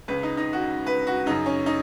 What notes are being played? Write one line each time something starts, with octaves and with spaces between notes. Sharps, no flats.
C#2 C#3 B4
D#4
D#4
F#4
B4
F#4
F#2 C#3 D#4
C#4
D#4